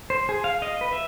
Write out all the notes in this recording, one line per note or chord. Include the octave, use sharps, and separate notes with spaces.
C5
G#4
F5
D#5
B4
E5